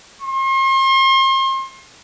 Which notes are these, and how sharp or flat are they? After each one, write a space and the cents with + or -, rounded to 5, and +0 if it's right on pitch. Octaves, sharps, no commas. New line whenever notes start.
C6 +40